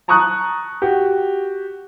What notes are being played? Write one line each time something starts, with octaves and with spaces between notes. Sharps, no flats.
A5 A#5 C#6 D#6 F#6
F#4 G4